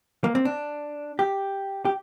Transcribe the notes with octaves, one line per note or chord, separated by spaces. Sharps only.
A#3
C4
D4
G4
G4